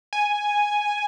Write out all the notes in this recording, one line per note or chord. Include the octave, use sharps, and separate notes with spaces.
G#5